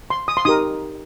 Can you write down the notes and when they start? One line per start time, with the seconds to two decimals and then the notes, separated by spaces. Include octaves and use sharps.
0.10 C6
0.28 D#6
0.37 C6
0.45 D#4 G4 A#4 D#6